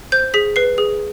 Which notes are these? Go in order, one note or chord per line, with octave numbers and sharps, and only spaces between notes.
C5 G6
G#4 B6
B4 C7
G#4